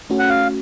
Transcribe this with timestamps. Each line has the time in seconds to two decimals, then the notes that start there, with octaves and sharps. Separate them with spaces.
0.10 A3 C#4 F#4
0.19 F#5
0.30 F5